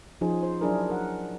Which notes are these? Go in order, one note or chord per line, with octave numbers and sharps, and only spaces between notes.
F3 C#4 D#4 G#4 C5
C5
F#3 D4 E4 G#4 A#4
A#4 F#5